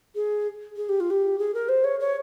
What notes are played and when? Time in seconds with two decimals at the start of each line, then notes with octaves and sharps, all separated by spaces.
0.15 G#4
0.76 G#4
0.88 G4
1.00 F4
1.10 G4
1.38 G#4
1.54 A#4
1.68 C5
1.84 C#5
1.99 C#5